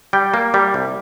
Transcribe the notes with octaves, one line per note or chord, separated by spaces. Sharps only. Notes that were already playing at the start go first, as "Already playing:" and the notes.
G3 G5
A#3
G3
C2